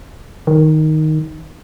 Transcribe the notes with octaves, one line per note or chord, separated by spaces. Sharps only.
D#3